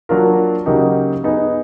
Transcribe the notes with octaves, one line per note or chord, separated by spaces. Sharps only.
F#3 A#3 D4 F4 A#4
C#3 F#3 A#3 D#4 G4
B3 D#4 G#4